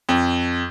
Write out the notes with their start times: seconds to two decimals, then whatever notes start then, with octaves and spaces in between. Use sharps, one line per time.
0.09 F2